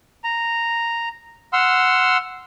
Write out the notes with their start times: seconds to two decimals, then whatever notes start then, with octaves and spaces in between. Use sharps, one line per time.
0.24 A#5
1.53 F#5 C6 E6 F6